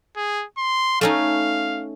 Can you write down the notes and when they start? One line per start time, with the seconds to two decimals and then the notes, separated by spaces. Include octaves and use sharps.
0.17 G#4
0.58 C6
1.01 A3 C#4 D#4 F5